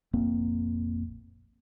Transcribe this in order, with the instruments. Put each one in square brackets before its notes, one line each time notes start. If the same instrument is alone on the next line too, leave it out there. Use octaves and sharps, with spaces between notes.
[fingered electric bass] F1 A#1 A#3 C4